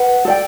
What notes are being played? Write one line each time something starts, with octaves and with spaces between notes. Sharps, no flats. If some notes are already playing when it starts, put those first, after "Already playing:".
Already playing: B4 F#5
A4 D5 G5